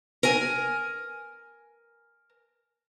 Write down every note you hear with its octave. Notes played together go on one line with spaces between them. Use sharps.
A#4 G#5